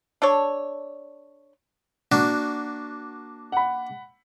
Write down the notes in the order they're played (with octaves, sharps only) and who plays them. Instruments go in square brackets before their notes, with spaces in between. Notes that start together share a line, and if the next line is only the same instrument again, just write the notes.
[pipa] D4 A4 C#5
[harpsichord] A#3 D4 F#4
[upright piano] F#5 B5